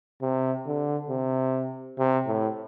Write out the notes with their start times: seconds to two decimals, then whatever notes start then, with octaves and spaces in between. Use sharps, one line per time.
0.22 C3
0.66 D3
1.09 C3
1.98 C3
2.27 A2